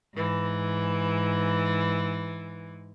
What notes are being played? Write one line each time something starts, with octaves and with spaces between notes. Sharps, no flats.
G#2 E3